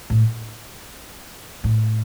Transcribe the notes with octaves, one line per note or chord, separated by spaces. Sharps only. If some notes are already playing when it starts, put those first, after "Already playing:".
A2
A2